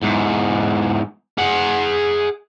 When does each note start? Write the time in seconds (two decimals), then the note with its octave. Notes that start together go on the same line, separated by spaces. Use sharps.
0.02 E2 G#2
1.38 G#4 F#5